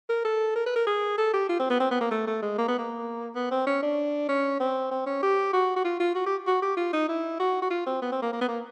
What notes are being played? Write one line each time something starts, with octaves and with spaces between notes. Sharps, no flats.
A#4
A4
A#4
B4
A#4
G#4
A4
G4
F4
C4
B3
C4
B3
A#3
A3
A3
G#3
A#3
B3
A#3
B3
C4
C#4
D4
C#4
C4
C4
C#4
G4
F#4
F#4
F4
F4
F#4
G4
F#4
G4
F4
D#4
E4
F#4
F#4
F4
C4
B3
C4
A#3
A#3
B3
A#3